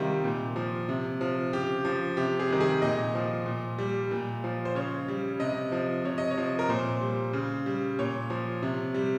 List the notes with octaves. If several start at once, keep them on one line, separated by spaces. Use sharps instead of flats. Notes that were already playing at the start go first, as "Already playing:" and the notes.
Already playing: C3 D#3 G3 F4
A#2
F3
C3
F3
C#3 G4
F3
C3 G4
G#4
D#3 G3
G#4
A#2 D#5
F3
A#2
G3
A#2
F3
C5
C#3 C#5
G3
C3 D#5
F3
C3 C#5
D#5
C#5
F3
A#4
A#2 C5
G3
C#3
G3
A#2 C#5
F3
C3
G3